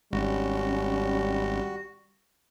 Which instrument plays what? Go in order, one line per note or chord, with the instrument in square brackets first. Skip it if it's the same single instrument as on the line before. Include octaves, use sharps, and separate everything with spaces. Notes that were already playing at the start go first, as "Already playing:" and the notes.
[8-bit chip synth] G#1 [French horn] G3 [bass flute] C#4 [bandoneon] F#4